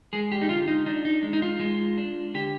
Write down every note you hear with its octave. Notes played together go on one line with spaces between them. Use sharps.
G#3 G#4
G4
D#4
D3 F4
D#4
D4 D#4
D#4
G#3
D#4
F4
G#3
D4
D3 G4